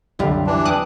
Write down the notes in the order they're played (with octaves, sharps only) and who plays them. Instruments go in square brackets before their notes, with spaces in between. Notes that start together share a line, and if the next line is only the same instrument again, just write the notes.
[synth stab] C2 D3 [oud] F#2 G3 F4
[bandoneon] E3 D4
[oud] F2 [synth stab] D6 D#6 F#6